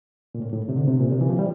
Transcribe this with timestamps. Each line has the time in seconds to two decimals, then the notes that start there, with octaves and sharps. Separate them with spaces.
0.35 A#2
0.40 A2
0.52 A2
0.69 C3
0.76 D3
0.88 C3
1.00 A#2
1.13 C3
1.21 E3
1.29 F3
1.39 G3